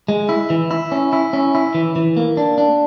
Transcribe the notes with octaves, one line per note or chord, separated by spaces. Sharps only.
G#3
E4
E3
E4
C#4
E4
C#4
E4
E3
E3
A#3
D4
D4